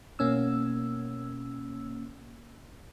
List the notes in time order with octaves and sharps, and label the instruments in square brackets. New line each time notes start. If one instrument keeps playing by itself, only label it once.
[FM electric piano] B2 A#3 C#4 E6